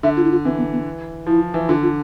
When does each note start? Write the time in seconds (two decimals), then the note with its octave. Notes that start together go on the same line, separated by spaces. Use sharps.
0.03 D3 E5
0.17 F4
0.24 E4
0.31 F4
0.44 E3 C4
0.58 B3
0.72 B3
1.26 F3 E4
1.54 E3
1.69 D3 F4
1.82 F4